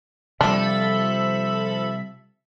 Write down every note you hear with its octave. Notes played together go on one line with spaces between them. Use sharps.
C3 F3 G3 D4 A4 E5 B5